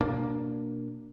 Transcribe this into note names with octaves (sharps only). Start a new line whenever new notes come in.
B2 A#3 D4